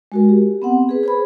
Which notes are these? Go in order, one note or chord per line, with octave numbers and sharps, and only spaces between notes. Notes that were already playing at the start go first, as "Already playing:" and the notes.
G#3 F#4 A#4
G4
B3 C4 F#5
G#4 B4
G#4 C5 B5